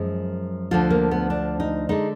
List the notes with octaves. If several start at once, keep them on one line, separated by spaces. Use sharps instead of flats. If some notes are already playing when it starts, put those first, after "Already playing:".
Already playing: F#2 F3 G#3
D2 D3 F3 F4
A#3
B3
D4
D#4
D3 G#3 D#4